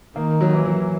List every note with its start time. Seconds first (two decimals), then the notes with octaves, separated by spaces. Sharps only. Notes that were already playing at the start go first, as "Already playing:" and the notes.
0.16 D#3 A#3
0.41 F#3
0.53 E3
0.66 F#3